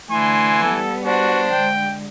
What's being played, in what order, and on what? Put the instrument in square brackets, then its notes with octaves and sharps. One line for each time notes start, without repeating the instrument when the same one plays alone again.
[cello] D3 A3 [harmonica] E3 G#5 [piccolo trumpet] C6
[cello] G3 B3 [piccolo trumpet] A4
[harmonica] D4 C5 [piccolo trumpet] F#4
[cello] D3 G#3 [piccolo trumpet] G5